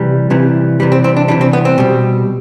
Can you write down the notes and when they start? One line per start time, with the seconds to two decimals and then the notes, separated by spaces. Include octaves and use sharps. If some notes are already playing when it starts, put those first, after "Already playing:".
Already playing: C3 E3 G3
0.30 C3 E3 G3
0.80 C3 E3 G3
0.92 C4
1.04 C4
1.17 D4
1.28 C3 E3 G3 D4
1.41 C4
1.53 B3
1.65 C4
1.78 B2 G3